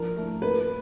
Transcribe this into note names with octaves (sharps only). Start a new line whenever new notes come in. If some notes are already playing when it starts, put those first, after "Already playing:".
Already playing: F3 D4 A#4
A3
A#3 B4